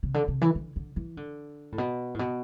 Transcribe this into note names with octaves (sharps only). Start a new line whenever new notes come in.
C3
D3
C3
E3
D3
D3
E3
D3
A2
B2
A2
B2